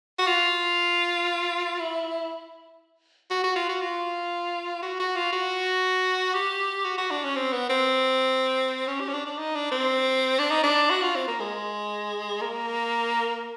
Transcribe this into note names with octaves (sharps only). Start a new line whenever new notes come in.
F#4
F4
E4
F#4
F#4
F4
F#4
F4
F#4
F#4
F4
F#4
G4
F#4
F#4
D4
C#4
C4
B3
C4
C#4
G4
C#4
D4
D4
D#4
D4
C4
D4
D#4
D4
F#4
F4
C4
A#3
G#3
A#3